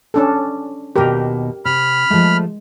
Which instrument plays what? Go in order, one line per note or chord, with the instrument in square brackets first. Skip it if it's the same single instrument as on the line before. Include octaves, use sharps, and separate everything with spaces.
[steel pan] C#4 D4 A4
[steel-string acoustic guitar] D#2 B2 [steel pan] G4 A#4
[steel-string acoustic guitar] C3 [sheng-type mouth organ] B5 F6
[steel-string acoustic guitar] F3 A3 [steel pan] G#3